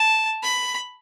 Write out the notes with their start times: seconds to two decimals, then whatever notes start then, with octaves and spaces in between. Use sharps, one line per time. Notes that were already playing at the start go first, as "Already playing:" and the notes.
Already playing: A5
0.42 B5